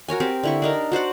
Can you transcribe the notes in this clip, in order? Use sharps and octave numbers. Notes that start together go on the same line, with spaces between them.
F#4 A#4 C#5 G#5
C4 G4 A#4
D3 E4 C#6
D4 D#4 A#4
F#4 C5 D5 F#5